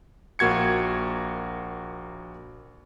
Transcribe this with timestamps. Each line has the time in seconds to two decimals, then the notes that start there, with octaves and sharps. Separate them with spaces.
0.39 A#1 A#3 F#4 G#6 C#7